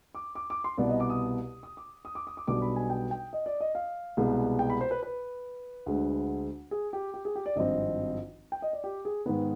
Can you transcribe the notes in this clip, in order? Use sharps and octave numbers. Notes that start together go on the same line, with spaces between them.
D6
D6
D6
C6
C2 B2 B3 D5
D#5
D6
D#6
D#6
D6
D#6
D6
D#6
D6
B1 B2 G3 B3 D4 D6
B5
G#5
G5
G5
D#5
D5
D#5
F5
C2 B2 G#3 B3
G5
B5
C5
B4
B4
D2 D3 G#3
G#4
G4
G4
G#4
G4
D5
G#1 G2 F3 C4 D#5
G5
D#5
D5
G4
G#4
G#2 D#3 B3 B4